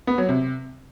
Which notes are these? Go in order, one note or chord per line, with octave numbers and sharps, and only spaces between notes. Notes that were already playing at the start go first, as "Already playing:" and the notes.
B3
F#3
C3